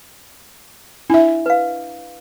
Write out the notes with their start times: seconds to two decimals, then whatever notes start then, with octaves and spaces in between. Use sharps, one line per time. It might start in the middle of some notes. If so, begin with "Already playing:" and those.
1.10 D4 E4 E5
1.46 B4 F5